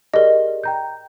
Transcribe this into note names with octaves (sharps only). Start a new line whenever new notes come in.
G4 G#4 A#4 D5 D#5
G5 A#5 G6